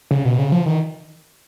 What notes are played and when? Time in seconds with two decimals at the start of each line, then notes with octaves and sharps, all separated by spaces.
0.11 C#3
0.25 B2
0.38 C#3
0.52 F3
0.66 D#3